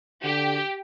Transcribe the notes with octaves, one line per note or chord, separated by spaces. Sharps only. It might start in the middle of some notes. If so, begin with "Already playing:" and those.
D3 G4